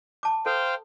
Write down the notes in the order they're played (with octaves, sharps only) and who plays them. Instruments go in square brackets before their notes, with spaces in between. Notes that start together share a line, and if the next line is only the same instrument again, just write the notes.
[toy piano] A5 D6
[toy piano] A4 [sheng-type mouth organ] C5 F5 G5